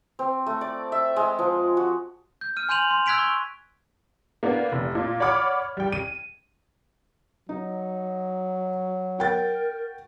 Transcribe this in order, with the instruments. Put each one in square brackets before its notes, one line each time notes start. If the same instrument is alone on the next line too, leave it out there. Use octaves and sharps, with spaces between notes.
[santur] C4
A3
D5
E5
G#3
F3
F#4
[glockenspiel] G6
F6 D#7
G#5 C6 G6 D#7 F7 F#7
C6
E6 F#6 G#6 B6 D7 F7
C#6
[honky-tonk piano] A#3 B3 D4
F1
A#2
C#5 D5 F#5 B5 D6 F6
G3 G5
D#7
[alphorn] F#3 [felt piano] D#4
[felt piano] F#4 G5 A6 [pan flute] A#4